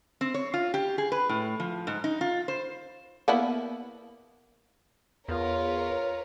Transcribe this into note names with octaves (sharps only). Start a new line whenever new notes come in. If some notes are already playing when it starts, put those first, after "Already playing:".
C4
C#5
F4
G4
G#4
B4
A2
F3
G#2
D#4
F4
C5
A#3 B3 E4
E2 F4 A#4 B4 C#5